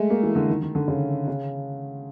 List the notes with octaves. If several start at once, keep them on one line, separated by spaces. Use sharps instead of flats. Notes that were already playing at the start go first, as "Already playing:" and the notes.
Already playing: G#3 A3
A#3
E3
D3
D#3
D#3
D3
C#3
C#3